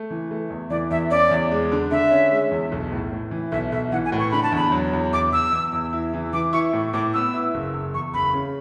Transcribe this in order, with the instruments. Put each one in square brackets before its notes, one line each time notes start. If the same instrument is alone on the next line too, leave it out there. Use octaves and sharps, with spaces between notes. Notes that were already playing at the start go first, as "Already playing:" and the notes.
Already playing: [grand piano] A3
E3
A3
E2
[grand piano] E3 [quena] D5
[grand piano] E2 [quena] E5
[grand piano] C#4 [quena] D5
[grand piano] E2
G#3
D3
[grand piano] D3 [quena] E5
[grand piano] C#4
G#3
E2
B1
A2
A2
E3
[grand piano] B1 [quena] E5
[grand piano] B1 [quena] E5
[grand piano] E3 [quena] F#5
[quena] G#5
[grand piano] A2
[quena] C#6
[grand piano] D3 [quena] B5
[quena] A5
[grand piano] E2 [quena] B5
[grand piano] F#3
E2
[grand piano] E2 [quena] D6
[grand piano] E2 [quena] E6
[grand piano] E2
E2
E4
E3
[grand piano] E3 [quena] D6
[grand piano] E4 [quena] C#6
[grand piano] A2
[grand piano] A2 [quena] D6
[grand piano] B3 [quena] E6
[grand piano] E4
F#1
F#1
[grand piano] E2 [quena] C#6
[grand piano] F#1 [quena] B5
[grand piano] C#3